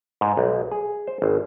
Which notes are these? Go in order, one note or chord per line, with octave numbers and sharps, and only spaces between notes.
G#2
B1
G#4
C5
G#1